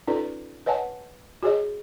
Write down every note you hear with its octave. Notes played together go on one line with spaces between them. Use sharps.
C#4 D#4 F4 A4 B4 D5
B4 C#5 D#5 F#5 G#5 A5
F#4 G#4 C#5 D#5